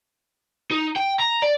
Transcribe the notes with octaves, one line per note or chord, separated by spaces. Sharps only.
D#4
G5
A#5
D5